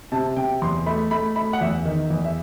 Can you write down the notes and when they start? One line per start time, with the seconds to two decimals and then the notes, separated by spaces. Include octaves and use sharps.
0.12 C3 A5
0.36 C3 G5
0.62 E2 C6
0.86 A3 B5
1.11 A3 B5
1.36 A3 B5
1.53 F#5
1.61 E2 E5
1.85 D#3
2.10 E2
2.24 E5